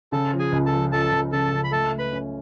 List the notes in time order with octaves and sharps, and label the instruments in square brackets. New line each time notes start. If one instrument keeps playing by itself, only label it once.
[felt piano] C#3 [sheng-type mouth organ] A4 A5
[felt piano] F3
[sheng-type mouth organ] G#4 G#5
[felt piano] C#2
[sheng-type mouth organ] A4 A5
[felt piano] F3
[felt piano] C#2 [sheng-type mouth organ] A4 A5
[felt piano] C#2
[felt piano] C#3 [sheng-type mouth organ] A4 A5
[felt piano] C#2
[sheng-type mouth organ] B5
[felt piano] A3 [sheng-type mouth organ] A4 A5
[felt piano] A3
[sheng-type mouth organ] B4 B5
[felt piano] C#4